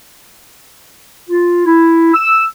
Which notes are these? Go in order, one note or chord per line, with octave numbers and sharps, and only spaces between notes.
F4
E4
E6